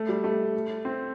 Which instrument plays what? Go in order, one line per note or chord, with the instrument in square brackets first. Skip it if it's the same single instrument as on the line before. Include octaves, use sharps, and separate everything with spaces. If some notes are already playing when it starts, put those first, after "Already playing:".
Already playing: [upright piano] A3
G3
A3
C4